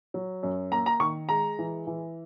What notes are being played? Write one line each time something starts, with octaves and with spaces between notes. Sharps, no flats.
F#3
F#2
A#3 A#5
A#5
D#3 C#6
G#3 A#5
E3
E3